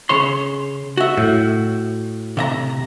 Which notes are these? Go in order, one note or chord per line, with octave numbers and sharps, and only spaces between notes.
C#3 C#5 C6
F#4 E5
A2
C3 E5 A#5